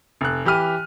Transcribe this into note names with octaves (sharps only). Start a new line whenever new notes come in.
F1 F#6
E3 G4 B5 F6 D#7